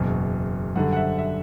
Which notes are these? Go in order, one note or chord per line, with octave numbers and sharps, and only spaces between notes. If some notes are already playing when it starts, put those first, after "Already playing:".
Already playing: F#1 E2 B2 F#3
F#2 D3 G3 F#5
F#5
E5
E5